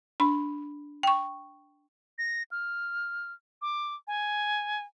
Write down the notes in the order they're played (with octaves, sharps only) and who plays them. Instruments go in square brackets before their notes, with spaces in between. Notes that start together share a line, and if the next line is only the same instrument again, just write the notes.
[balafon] D4 B5
G5 C#6
[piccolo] A#6
F6
D6
G#5